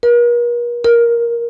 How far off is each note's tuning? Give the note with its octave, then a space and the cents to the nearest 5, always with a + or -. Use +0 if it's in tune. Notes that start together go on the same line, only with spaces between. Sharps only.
A#4 +45
A#4 +10